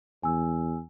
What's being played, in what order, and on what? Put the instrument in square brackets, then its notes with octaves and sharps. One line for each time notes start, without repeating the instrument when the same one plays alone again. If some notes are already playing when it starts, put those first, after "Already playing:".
[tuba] E2 [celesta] G#5 E6